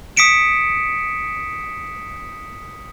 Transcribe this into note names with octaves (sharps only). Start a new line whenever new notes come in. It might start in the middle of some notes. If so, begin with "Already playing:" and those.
D#6 B6 C#7 D7 E7